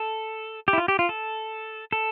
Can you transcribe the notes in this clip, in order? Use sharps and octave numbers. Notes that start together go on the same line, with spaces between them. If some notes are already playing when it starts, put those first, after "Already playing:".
Already playing: A4
G4
E4
F4
G4
F4
A4
A4